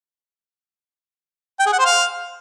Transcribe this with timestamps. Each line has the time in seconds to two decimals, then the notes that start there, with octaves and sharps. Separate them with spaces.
1.60 G5
1.66 G#4
1.72 F#5
1.79 C5
1.85 F5